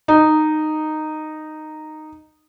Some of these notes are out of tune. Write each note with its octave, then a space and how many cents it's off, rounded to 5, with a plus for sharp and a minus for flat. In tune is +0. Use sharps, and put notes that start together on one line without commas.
D#4 -10